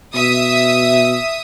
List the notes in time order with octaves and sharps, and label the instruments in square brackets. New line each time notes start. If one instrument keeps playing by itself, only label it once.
[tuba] B2 [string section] E5 D#6